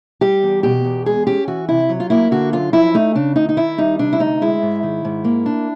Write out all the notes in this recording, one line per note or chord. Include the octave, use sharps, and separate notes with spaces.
G3 G4
E2
B2 G4
E2
G#3 G#4
C#4 G4
E3 F#4
C3 E4
F#3
F4
A#3 E4
D3 F#4
F#2 F4
F3 E4
A3 D#4
C#3 D4
D2 D#4
D#4
D#3 E4
G3 D#4
C3 D4
E4
D2 D#4
G#3 E4
G#2
D#3
G#2
A#3
D4